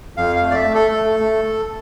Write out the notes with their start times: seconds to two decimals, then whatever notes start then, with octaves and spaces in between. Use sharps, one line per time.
0.16 F2 F5
0.36 F5
0.43 A3
0.51 D5
0.55 E5
0.68 A3
0.74 A4
0.94 A3
1.20 A3